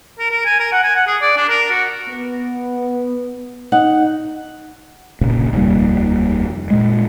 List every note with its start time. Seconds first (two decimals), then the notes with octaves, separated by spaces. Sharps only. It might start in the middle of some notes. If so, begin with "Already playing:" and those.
0.19 A#4
0.31 A#4
0.46 G#5
0.60 A#4
0.72 F#5
0.84 G#5
0.96 F#5
1.07 G#4
1.21 D5
1.37 D4
1.49 A#4
1.71 F#4
2.09 B3
3.72 D#4 F#5
5.21 F1 A#1 A#2 C#3
5.53 F1 D#2 G3 A#3
6.70 A#2 G#3